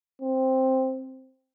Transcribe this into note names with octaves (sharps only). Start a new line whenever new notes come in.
C4